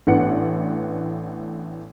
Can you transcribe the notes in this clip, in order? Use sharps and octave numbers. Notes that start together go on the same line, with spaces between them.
A1 A2 B3 D4 F#5 C#7